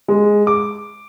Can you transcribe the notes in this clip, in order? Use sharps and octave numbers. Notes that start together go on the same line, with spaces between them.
G#3
D6